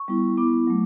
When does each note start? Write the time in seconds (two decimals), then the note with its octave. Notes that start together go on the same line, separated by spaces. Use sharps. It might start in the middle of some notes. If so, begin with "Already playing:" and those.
Already playing: C#6
0.08 G3 B3 E4
0.37 B3 E4 D6
0.67 F#3 A3